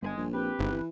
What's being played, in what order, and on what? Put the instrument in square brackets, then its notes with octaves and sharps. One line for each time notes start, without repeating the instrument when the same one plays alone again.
[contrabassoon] G1 [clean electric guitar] G2 B4 G#5 [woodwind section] G#3
[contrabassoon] A#1
[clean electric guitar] C4 [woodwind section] G4 B4
[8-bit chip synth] G1 [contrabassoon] G#2
[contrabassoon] E3